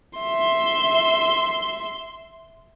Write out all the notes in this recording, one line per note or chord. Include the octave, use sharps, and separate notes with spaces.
E5 C6